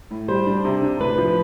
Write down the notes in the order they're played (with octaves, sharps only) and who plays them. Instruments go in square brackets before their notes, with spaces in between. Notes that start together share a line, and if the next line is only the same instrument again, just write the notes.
[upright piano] A2
[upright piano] G3 [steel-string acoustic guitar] C5
[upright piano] D4
C3
D4
[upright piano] A2 [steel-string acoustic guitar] B4
[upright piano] F3